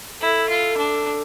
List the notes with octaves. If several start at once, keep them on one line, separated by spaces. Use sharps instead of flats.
E4 A4
F4
D4